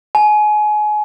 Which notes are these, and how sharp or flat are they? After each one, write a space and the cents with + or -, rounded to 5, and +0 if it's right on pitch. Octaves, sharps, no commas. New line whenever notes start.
G#5 +30